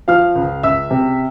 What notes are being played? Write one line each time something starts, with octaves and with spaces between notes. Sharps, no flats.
F3 F5 F6
C#2
C#2 E5 E6
C3